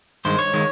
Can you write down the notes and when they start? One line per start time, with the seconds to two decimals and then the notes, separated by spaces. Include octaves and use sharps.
0.25 G2 D#3 G#3 C5
0.39 C#5
0.54 D#3 G#3